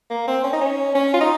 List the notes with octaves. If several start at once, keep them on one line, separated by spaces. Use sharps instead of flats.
A#3
C4
C#4
D#4
C#4
C#4
F4
D#4